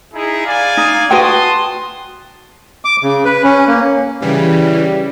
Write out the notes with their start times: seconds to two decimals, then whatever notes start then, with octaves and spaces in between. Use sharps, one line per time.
0.14 D#4 E4 G#4
0.46 D5 F5 G#5
0.77 D#4
1.11 F#4 B4 G5 A5 C6 D#6
2.85 D6
3.03 C#3
3.25 B4
3.44 C#4
3.68 A#3
4.22 C#3 E3 G3